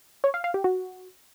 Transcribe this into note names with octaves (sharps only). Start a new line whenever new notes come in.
C#5
F5
F5
G4
F#4